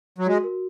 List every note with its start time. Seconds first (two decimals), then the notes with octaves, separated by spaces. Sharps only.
0.18 F#3
0.27 G#3 F#4
0.44 A#4